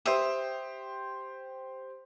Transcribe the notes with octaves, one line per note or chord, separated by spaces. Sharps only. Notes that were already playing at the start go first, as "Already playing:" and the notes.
G4 C5 E5 D#6